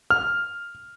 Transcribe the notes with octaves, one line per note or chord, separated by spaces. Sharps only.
F6